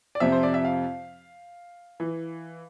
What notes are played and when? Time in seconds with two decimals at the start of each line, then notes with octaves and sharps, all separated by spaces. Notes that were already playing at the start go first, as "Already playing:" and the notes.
0.15 D5
0.20 F2 C3 F3 E5
0.32 C5
0.43 D5
0.54 E5
0.65 F5
2.00 E3